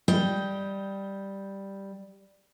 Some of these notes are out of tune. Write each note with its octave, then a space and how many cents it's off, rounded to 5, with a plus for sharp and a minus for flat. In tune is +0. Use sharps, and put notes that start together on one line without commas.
G3 +0 D#5 +25 G5 +0